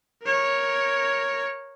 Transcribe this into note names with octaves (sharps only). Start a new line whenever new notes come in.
A#4 C#5